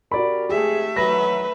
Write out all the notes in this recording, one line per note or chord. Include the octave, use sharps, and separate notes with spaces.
C3 F#4 G4 A#4 D5 B5
F2 G#2 A3 G4 G#4 E5
D#3 E3 F#3 B4 A#6